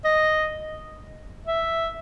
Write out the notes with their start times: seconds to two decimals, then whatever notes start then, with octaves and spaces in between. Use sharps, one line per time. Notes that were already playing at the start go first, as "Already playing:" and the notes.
0.05 D#5
1.46 E5